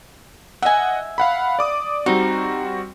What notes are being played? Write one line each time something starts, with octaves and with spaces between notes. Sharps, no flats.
D#5 E5 F#5 G#5
F5 F#5 B5
D5 D6 D#6
G3 C4 D#4 F#4